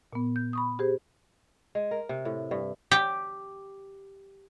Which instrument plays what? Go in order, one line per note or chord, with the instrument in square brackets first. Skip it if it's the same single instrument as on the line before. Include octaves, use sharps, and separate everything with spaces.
[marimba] A#2 B3
G6
B5 C#6 D#6
G4 G#4 C5
[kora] G#3
A#4
C3
A2
G2
[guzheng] G4